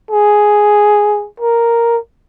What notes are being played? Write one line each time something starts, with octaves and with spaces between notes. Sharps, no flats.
G#4
A#4